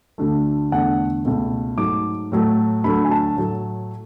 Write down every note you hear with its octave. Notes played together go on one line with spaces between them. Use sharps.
D2 D3 A3
E2 D3 A3 F#5
C#2 B2 A3
G#2 F#3 A3 D6
A2 F#3 A3
D2 D3 F#3 A3 B5
G#5
A5
A2 F#3 A3